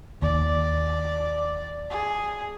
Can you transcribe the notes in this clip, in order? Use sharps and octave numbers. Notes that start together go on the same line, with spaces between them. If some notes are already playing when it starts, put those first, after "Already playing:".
D#2 D5
G#4